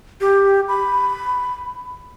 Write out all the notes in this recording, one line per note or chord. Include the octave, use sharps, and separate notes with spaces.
G4
B5